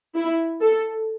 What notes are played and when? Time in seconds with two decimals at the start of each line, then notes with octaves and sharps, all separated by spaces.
0.15 E4
0.61 A4